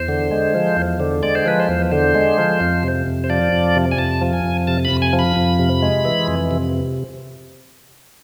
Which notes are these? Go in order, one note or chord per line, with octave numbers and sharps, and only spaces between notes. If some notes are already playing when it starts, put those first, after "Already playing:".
Already playing: E2 C5
D3
G#3
F3
E2
D3
G#3 D5
C5
F3 B4
C5
E2
D3 C5
G#3
F3
F2
C3
F2
C5
F3 D5
F2
C3
G#5
F2 A5
F3
G#5
F2
C3 A5
B5
F2
G#5
F3
B5
F2
C3
G#3
E3
F2
C3